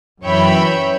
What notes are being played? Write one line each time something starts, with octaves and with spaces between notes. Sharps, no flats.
F#2 E3 C#5 E5 G5 B5